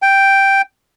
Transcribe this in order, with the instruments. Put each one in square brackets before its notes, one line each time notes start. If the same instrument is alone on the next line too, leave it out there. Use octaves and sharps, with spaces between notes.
[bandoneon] G5